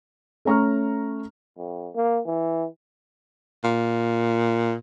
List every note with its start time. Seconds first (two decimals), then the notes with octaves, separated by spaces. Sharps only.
0.45 A3 C#4 A#5 C#6 F6
1.58 F2
1.95 A#3
2.26 E3
3.64 A#2